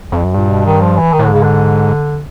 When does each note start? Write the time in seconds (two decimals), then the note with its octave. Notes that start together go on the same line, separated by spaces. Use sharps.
0.12 F2
0.24 F#2
0.34 G2 A#2
0.49 B2
0.66 D#3
0.81 F3
0.97 E3
1.12 D#3
1.19 A2
1.23 D3
1.28 G#2
1.33 C#3
1.43 D3